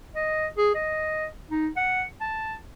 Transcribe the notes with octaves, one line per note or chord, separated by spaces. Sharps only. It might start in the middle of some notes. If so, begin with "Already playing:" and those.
D#5
G#4
D#5
D#4
F#5
A5